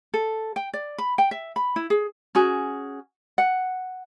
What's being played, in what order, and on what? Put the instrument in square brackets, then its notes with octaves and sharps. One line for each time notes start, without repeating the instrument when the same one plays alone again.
[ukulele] A4
G5
D5
B5
G5
E5
B5
E4
G#4
C#4 F#4 G#4
F#5